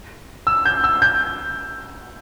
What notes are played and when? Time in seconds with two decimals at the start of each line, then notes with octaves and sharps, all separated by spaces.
0.47 E6
0.65 G6
0.84 E6
1.02 G6